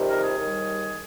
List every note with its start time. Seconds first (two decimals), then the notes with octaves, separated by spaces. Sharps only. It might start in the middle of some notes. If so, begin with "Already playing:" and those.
Already playing: F2 C3 D#3 G3
0.08 A#4
0.23 G#4
0.38 D#2 D#3 G3